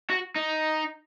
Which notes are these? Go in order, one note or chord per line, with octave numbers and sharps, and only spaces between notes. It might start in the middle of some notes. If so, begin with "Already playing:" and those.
F#4
D#4